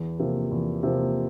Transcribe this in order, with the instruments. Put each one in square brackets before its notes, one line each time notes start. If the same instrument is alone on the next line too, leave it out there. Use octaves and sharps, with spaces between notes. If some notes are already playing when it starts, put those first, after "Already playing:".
Already playing: [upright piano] E2
C3 F3 A#3
E2
C3 F3 A#3